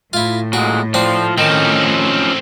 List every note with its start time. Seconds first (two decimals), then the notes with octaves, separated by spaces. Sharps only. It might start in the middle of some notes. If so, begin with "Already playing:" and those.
0.13 A2 E4 F4
0.53 A#2 G#3 F#4
0.94 F3 C4 D4 C5
1.38 D#3 F3 C4 C#4 D#4